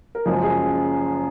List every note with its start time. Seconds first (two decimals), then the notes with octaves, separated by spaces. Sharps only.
0.15 A#4
0.25 F#1 F#2 C#3 F3 G#3 G#4
0.42 G#4